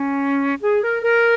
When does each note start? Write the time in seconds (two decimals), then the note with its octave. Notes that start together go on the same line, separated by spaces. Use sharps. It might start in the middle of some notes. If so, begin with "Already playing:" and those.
Already playing: C#4
0.63 G#4
0.83 A#4
1.03 A#4